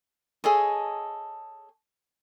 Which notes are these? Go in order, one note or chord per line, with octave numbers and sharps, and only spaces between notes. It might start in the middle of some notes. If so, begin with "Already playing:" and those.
G#4 A4 C#5 D#5